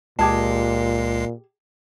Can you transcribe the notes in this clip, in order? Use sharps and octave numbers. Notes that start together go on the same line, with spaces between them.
C#2 A#2 G#3 G4 G#4 A5 C7